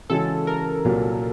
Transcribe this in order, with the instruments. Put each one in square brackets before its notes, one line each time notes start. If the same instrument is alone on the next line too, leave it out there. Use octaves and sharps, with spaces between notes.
[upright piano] C#3 E3 G#3 C#4 F#4 [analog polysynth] A4
[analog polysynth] A#4
[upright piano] C2 A#2 F#3